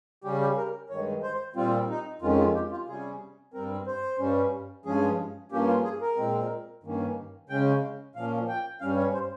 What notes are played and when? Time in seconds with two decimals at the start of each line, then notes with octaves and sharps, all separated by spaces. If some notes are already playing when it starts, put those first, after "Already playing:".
0.24 C#3 G3 C#4 G4
0.41 G4
0.57 A#4
0.90 G2 D#3 G#3 C#5
1.23 C5
1.56 A#2 G3 C4 F4
1.90 D#4
2.22 F2 D#3 G#3 C#4 F4
2.39 F4
2.55 G4
2.72 F4
2.87 C3 G3 C#4 G#4
3.54 G2 G3 C4 A#4
3.87 C5
4.19 G2 G3 C#4
4.85 G2 F3 G#3 C#4 G#4
5.52 G2 F3 A#3 C#4 G4
5.68 F4
5.84 G#4
6.02 A#4
6.17 A#2 G#3 C4
6.83 G2 D#3 A#3 C#4
7.49 C#3 G#3 C#4 G5
8.16 A#2 F3 A#3 C#4 F5
8.48 G5
8.81 G2 G3 C#4 F5
8.97 C#5
9.14 C5